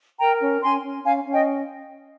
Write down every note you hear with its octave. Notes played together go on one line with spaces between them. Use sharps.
A#4 G5 A#5
C#4
C#4 G#5 C6
C#4
C#4 F5 G#5
C#4
D#5 G5